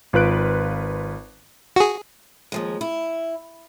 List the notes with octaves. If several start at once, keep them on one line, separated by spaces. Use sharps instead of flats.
G#1 F4 B4 F#6 D7
F#4 G#4
D#2 F3 G#3
E4